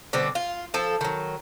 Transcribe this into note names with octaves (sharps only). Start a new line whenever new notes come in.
B2 D3 G3 C4
F4
F3 A4
D#3 F#3